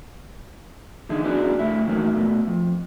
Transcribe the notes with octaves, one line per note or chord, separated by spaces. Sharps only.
D3 E3 D#4 G#4
B3 C#4 D4 E4 F#4 G#4
C#3 A3 E4
A2 D#3 E3 F#3 A3 A#3
B2 A3
F2